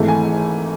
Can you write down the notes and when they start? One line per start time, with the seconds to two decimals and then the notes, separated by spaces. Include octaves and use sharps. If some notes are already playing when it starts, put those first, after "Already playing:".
Already playing: G#1 G#2 E3 A3
0.08 G#5